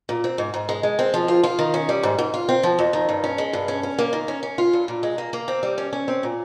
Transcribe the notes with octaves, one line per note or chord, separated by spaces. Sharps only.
A#2
C4
G#2
G#2
G#3
G#3
C4
F3
F4
F4
D#3
C#4
G3
G#2
G#2
F4
C4
F3
F2
D#3
G2
C#4
G#3
G2
C#4
C#4
A#3
D#3
C#4
C#4
F4
G2
A#2
G#3
A#3
A#3
C4
G3
C#4
C#4
C4
A#2